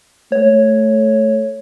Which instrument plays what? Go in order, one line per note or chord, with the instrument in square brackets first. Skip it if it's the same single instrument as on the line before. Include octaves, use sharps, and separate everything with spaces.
[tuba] A3 [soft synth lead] C#5